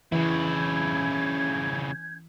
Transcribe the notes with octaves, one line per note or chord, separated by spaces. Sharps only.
C#3 E3 C#4 E4 G6 G#6